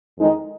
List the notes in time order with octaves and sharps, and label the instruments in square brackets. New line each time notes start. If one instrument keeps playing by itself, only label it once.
[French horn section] F2 D#3 G#3 D#4